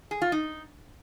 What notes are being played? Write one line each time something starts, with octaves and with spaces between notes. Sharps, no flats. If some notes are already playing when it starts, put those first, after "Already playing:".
G#4
F4
D#4